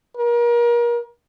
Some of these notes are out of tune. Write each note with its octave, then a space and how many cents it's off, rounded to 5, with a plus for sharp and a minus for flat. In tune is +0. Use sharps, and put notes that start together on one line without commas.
A#4 +35